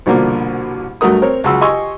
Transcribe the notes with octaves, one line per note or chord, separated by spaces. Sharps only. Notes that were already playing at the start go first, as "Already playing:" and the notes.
C2 B2 D3 F3 A#3
G2 F#3 A3 F#4 A#4 D#6
C4 A#4 C#5
C#2 C#3 F#3 F#4 C6 E6
G4 D#5 G#5 C6 C#6 E6